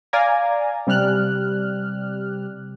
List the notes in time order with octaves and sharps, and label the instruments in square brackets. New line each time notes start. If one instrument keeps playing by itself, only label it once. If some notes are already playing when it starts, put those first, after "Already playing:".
[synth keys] D5 F5 G#5 A#5
C3 G3 D5 F6 F#6